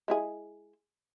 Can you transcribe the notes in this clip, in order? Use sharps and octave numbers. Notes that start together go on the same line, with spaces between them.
G#3 E4 G#4